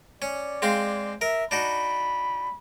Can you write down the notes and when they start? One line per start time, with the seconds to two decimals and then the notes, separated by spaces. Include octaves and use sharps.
0.22 C#4 D5
0.62 G#3 C4 F5
1.21 A#4 E5
1.51 D4 D#4 F#4 B5